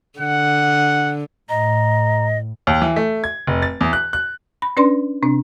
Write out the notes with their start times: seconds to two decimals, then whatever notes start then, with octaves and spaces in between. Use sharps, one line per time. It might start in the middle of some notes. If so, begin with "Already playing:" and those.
0.19 D3 F#5
1.49 A2 D#5 A#5
2.67 D#2
2.82 E3
2.96 A3
3.24 G#6
3.47 F1
3.62 A6
3.81 E2
3.93 F#6
4.13 F#6
4.62 B5
4.77 C#4 D4 B4 D5 C6
5.23 C3 C4 D4